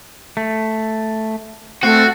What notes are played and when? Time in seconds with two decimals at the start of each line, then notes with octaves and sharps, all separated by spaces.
0.37 A3
1.83 A3 C4 F#4